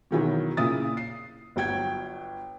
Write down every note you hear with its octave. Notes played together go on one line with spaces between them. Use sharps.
B2 D#3 E3 F#3
A#2 C#3 E4 D#6 A6
C7
G1 F#3 G5 G#6